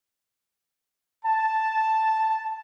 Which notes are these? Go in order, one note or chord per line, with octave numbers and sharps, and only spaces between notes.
A5